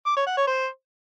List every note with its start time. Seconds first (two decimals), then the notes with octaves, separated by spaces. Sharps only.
0.06 D6
0.16 C#5
0.27 F#5
0.37 C#5
0.47 C5